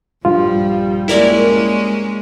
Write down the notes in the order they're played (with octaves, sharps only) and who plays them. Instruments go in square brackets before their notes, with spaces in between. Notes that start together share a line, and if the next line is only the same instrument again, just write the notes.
[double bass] A#1 G3 [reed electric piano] G2 F4 [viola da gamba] F3
[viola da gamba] G#3 A#3 C#4 [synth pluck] E4 A#4 D5